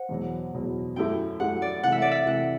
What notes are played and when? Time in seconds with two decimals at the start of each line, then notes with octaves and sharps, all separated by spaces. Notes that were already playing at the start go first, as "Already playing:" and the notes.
Already playing: C5 F#5
0.09 E2 B2 F#3
0.54 E2 B2 F#3
0.96 F#2 F#3 A3 E4 G4 G5
1.39 F#2 F#3 A3 E4 G4 F#5
1.62 D5
1.83 C3 E3 A3 F#5
1.92 E5
2.02 D5
2.11 E5
2.26 C3 E3 A3 F#5